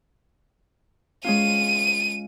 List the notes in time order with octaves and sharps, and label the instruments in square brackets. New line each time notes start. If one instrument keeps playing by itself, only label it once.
[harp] G#3 C#4 F4 [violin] D#7